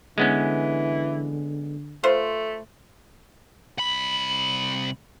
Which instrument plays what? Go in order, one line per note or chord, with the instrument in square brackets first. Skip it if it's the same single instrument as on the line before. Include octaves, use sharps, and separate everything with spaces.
[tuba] D3 [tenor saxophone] E3 [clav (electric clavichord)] G#3 B3 C#4
[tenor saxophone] A3 [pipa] F4 B4 C5
[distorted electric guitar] C2 B5 [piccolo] F#7